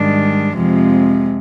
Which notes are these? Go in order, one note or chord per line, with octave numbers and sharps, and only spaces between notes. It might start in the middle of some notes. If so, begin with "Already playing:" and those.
Already playing: G#2 D#3 G3 D4
F2 C3 F3 G#3